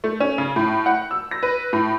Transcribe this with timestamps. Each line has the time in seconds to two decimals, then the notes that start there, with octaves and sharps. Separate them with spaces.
0.04 A3
0.20 C#4
0.38 C#3
0.56 A2
0.86 F#5
1.11 E6
1.31 A#6
1.43 B4
1.73 A2